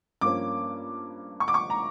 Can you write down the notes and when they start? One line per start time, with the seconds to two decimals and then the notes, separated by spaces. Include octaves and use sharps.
0.21 G2 F3 A#3 C#4 D6
1.40 C#6
1.48 D6
1.54 C#6
1.70 A#5